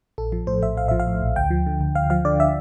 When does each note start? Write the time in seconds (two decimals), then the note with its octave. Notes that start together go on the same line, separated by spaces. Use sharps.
0.18 A#1 A4
0.32 F3
0.47 A2 C5
0.62 A#1 E5
0.77 A#1 F5
0.88 F3 E5
1.00 F5
1.07 A2
1.22 A#1
1.36 D2 G5
1.51 F3
1.66 D3
1.80 D2
1.95 D2 F5
2.10 F3 F5
2.25 D3 D5
2.40 E5